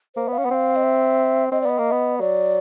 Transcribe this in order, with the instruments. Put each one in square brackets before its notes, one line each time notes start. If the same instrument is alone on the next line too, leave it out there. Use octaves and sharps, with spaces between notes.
[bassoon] A#3 [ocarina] C5
[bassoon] B3 [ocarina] F5
[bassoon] C#4
[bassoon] B3 [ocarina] F#5
[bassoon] C4 [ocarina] F5
[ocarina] D#5
E5
[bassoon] C4 [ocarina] D#5
[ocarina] D5
[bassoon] B3 [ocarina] D#5
[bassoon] A#3
B3
[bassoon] F#3 [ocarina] D5